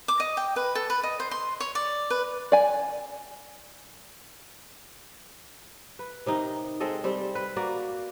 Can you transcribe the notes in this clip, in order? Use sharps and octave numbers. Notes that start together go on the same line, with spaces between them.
D6
D#5
G5
B4
A4
B4
D#5
C5
C6
C#5
D5
B4
D5 G#5
B4
C3 D#3 D#4
G#3 C4 A4 D#5
G3 C4
B4
A#3 F#4 D5